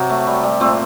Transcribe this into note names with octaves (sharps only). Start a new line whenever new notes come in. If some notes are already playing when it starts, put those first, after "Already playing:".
Already playing: C3 F#3
A3
G3
G3
A#2 A3 C4